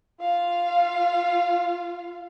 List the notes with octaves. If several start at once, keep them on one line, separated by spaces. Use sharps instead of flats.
F4 F5